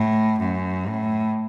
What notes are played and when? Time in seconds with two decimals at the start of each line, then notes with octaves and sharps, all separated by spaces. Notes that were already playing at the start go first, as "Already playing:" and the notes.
Already playing: A2
0.40 F#2
0.87 A2